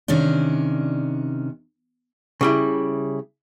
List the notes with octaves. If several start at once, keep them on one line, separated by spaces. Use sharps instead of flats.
C3 D#3 C#4 D4
C#3 G3 E4